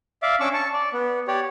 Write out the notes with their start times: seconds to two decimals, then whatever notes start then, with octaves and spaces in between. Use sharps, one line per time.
0.22 D5 E5 F5 D6
0.40 C#4 D4 C#6 D6 E6
0.54 A5 C#6
0.74 D5
0.93 B3
1.28 G4 C#5 D5